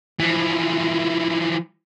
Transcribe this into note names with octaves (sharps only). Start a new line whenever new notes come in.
E3 F3